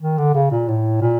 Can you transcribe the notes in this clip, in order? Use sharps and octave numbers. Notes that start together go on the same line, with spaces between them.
D#3
D3
C#3
A#2
A2
A#2